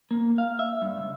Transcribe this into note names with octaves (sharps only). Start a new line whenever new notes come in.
A#3
F5
E5
G2
C#2